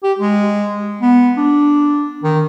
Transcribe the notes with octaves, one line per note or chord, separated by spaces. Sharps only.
G4
G#3
B3
D4
D#3